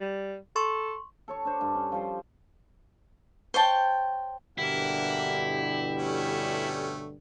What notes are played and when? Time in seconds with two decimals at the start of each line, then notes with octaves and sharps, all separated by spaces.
0.01 G3
0.56 A4 C6 C#6
1.28 A4 C#5 C#6
1.45 D4 C5
1.61 G2
1.75 C#4
1.92 F3 G3 C5
3.54 C5 C#5 G5 A5
4.58 G2 B2 D3 E3 A#3 E4 G4 F#5
5.98 G3 A3 C#4